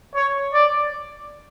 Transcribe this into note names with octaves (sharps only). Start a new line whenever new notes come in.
C#5
D5